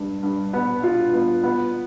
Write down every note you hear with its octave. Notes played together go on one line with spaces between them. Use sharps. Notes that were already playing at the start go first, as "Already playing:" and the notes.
Already playing: G2
G2
B3
F4
B3
B3